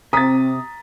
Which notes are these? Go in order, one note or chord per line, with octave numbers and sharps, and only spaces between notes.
C3 C4 A#5 D#6 A6 B6